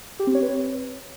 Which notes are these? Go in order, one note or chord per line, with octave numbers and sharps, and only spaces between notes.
G4
C4
C#5
B4